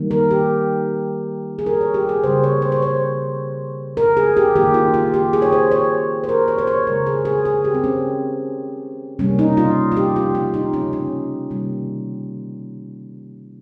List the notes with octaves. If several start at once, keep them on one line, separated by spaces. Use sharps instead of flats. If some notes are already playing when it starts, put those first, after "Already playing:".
Already playing: D#3 G3 A#3
A#4
G4
G#4
A#4
C#5
G4
G#4
C#3 G3 A#3 C5
C#5
C5
C#5
C5
A#4
G#4
G4
D#3 A#3 G4
F4
F4
G4
G#4
C#5
C5
C#5
C5
A#4
C#5
C5
C#5
C#3 G#3 A#4
G#4
G#4
G#4
G4
C4
C#4
C3 G3 A#3 C#4
D#4
F4
F4
G4
F4
F4
D#4
C#4
C#4
C3 D#3 G3 A#3